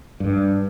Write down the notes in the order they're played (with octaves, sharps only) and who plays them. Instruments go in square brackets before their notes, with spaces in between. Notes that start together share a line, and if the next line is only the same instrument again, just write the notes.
[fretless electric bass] G2